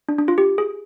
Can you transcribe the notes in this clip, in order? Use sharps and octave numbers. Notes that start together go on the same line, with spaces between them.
D4
D4
F4
G4
G#4